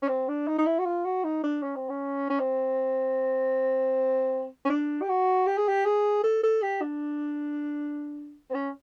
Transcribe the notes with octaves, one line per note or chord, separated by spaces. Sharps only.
C#4
C4
D4
D#4
D#4
E4
F#4
F4
F#4
D#4
D4
C#4
C4
C#4
C#4
C4
C#4
D4
G4
F#4
G4
G#4
G4
G#4
A4
A4
G4
D4
C4
C#4